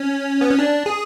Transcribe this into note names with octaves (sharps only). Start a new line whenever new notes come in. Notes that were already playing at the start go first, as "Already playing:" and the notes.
Already playing: C#4
B3
C#4
D4
G#4